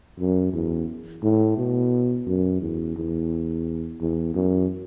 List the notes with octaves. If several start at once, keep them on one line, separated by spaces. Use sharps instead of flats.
F#2
E2
A2
B2
F#2
E2
E2
E2
F#2